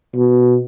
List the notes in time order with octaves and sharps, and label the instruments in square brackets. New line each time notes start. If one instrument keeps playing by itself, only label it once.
[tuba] B2